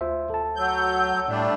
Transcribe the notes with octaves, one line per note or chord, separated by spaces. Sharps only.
D2 F4 C5 E5
A4 A5
F#3 C#5 F#5 E6 G6
A2 G3 A3 D4 D5